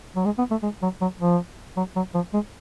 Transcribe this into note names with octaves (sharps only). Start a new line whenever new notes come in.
F#3
G#3
B3
A3
G#3
F#3
F#3
F3
F#3
F#3
F3
G#3